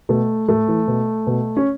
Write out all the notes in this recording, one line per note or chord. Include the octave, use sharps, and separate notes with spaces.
B2 A3
A2 A3
E3
B2
B2
C#4